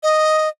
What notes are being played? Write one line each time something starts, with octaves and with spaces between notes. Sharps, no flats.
D#5